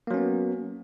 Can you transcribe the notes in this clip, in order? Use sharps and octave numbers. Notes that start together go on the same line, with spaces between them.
F#3 A#3 B3 C#4